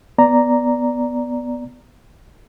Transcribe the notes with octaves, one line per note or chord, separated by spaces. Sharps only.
B3 D5 A#5